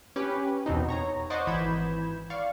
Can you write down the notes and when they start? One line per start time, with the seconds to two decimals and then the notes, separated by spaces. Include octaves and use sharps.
0.16 C#4 G4 B4
0.66 E2 B2 C4 D#4
0.88 C#5 A#5
1.30 C5 D5 D#5 F#5 C#6 D6
1.47 G#1 E3 B5 G6 G#6 E7
2.30 D5 F5 C#6